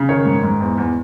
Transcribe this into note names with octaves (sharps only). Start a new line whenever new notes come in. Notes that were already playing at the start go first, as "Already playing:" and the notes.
Already playing: C#3
D#3 C#5
G#2
G#2
E2
E2